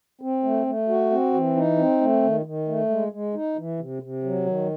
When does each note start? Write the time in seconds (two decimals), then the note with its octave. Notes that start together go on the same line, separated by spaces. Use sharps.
0.21 C4
0.44 A3
0.66 A3
0.88 F#4
1.11 C4
1.34 E3
1.56 D#4
1.78 C4
2.01 A3
2.23 D#3
2.46 D#3
2.68 A3
2.89 G#3
3.12 G#3
3.34 D#4
3.57 E3
3.79 C3
4.02 C3
4.24 F#3
4.46 D#3